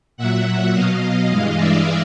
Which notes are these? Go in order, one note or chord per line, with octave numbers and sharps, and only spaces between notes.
A#2 F#3 E5 F#5
B2 F#3 D#5 F5
G2 E3 G#3
D5 E5